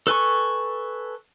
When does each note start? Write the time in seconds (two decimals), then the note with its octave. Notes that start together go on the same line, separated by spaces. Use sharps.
0.07 A4 B4 G#5 C#6